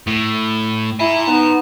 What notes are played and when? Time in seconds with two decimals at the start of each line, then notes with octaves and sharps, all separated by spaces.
0.07 A2
1.00 E4 G#5 A#5
1.28 B3 D#4